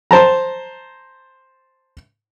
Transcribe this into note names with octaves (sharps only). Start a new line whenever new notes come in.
C5 A5 A#5